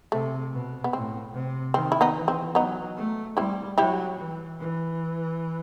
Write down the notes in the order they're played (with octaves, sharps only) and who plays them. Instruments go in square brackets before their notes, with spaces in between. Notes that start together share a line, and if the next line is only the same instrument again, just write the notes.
[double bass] C3 [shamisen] A3
[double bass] B2
[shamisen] B3
[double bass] A2 [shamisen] C4
[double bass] C3
[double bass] D#3 [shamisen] C4
[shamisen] E4
B3 D#4
[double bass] E3
[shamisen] C4
[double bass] F#3 [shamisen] B3 D#4
[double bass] A3
[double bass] G3 [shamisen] C4 E4
[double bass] F#3 [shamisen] E4 G4
[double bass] E3
E3